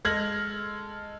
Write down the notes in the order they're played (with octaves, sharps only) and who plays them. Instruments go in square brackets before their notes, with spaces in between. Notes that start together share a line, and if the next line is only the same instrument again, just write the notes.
[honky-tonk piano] G#3 A4 F6 G#6 A#6 F#7